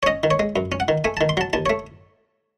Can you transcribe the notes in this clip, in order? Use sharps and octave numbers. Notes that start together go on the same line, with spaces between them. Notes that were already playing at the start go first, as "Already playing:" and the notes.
C#5
C#4 D#5
D#3
C#5
G#3
F#2
C#4
F#5
D#3
A3 G#5
D#3 A5
C6
F#3 A5
D#2 A5
A3 C#5